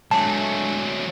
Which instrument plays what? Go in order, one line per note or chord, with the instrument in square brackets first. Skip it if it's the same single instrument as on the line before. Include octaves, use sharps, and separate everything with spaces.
[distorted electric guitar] F#3 A3 [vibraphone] G#3 D4 [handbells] A5